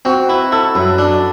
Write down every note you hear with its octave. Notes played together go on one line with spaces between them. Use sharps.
C4 F#4
E4 B4
E4 A4
F#2 B4
D4